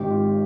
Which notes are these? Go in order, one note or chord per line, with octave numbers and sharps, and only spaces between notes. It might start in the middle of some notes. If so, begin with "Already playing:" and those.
Already playing: G#1 G#2 D#3 G4
F4